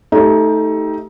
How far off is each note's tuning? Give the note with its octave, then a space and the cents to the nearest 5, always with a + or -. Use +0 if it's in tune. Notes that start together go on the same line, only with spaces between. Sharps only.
A3 +0 D#4 +20 G4 -10